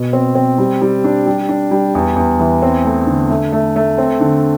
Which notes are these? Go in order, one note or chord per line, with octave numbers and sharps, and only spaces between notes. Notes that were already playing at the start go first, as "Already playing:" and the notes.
Already playing: B2
C4
C4
G3
G3
D4
G3
D4
G3
E2
E2
E3
C4
A3
D3
A3
A3
A3
C4
D3